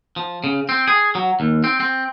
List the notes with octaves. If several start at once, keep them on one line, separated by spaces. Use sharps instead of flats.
F3
C#3
C4
G#4
F#3
D#2
C4
C4